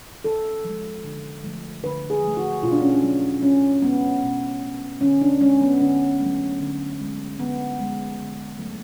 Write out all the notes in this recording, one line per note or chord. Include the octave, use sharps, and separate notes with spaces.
C#3 A4
F3 G#3
D3
F3 A3
D3 B4
G#4
F3 A3
F#4
B2 F4
D4
C#4
D4
F#3 A3
C#3 C#4
G#3 B3
B2
A3
D3 C#4
D4
G#3 C#4
B3
D3 C#4
F#3 A3
D3
G#3
D3 B3
F3 G#3
D3
F#3 A3